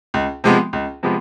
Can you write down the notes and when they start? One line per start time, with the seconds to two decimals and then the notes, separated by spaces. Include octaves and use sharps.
0.14 C#2
0.44 C3 F3 G#3 B3
0.73 C#2
1.03 C3 F3 G#3 B3